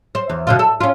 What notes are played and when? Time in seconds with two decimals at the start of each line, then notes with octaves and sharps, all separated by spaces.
0.15 C5
0.29 E2
0.47 B2 D3 F4
0.59 A4
0.81 C#4 F4